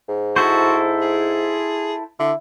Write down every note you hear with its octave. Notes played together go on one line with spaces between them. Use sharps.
G#2
E4 F#4 A4 C5
G#4
D3 E4